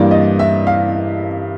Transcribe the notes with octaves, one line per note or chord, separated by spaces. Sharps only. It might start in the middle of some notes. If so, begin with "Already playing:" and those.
Already playing: G2 E3 G3 A#3 D5
D#5
E5
F5